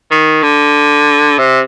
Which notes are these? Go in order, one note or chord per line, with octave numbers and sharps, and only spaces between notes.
D#3
D3
C3